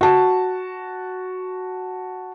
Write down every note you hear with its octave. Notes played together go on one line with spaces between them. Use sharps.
F#4 A5